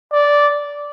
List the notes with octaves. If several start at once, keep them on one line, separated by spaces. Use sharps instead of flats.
D5